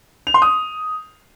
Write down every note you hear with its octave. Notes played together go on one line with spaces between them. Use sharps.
F7
C6
D#6